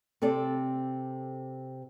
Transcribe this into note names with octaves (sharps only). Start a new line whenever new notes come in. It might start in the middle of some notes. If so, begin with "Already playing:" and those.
C3 C4 A4 D5